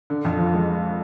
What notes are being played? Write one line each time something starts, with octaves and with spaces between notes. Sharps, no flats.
D3
F2
F3
G#3